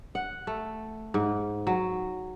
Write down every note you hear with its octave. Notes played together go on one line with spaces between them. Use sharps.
F#5
A3
G#2
F#3